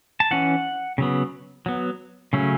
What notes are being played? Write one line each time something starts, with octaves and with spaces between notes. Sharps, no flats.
A5
E3 C#4 F#5
C#3 F#3 B3
F#3 B3
C#3 F#3 A3 C#4